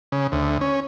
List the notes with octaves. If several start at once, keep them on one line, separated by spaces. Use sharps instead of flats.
C#3
D2
C#4